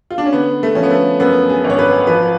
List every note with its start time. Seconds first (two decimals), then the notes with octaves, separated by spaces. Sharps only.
0.11 F4
0.18 D4
0.26 C#4
0.33 D3 B3
0.63 A3
0.75 F3 C#4
0.83 B3
0.91 A3
1.20 F#2 B3
1.50 G#4
1.64 G#1
1.70 C#5
1.79 B4
2.07 F3 B4